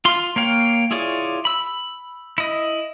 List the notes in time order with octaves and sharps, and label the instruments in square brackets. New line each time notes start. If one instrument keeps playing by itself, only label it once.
[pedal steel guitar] F4 C6
A#3 C#5 F5 G5
E4 F4 G#4 C#5 D5
B5 E6
E4 D#5